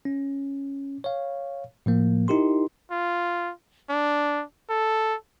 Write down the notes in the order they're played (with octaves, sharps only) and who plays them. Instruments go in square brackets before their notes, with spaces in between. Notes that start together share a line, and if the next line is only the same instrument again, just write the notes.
[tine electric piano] C#4
C#5 F5
A2 F3 A#3
D#4 E4 G4 A#4 C6
[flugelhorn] F4
D4
A4